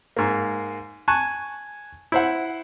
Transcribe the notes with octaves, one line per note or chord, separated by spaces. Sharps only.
G#2 A#3
G#5 A5 C#6 F#6
E4 C5 F#5